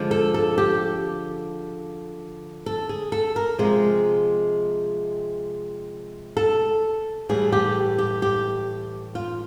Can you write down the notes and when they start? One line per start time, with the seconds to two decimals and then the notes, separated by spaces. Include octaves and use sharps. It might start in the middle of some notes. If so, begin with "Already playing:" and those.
Already playing: D3 F3 G#3
0.11 A4
0.34 A4
0.58 G4
2.66 A4
2.89 G#4
3.12 A4
3.36 A#4
3.58 C3 F3 G#3 G#4
6.37 A4
7.29 A2 E3 G3 G#4
7.52 G4
7.98 G4
8.22 G4
9.15 F4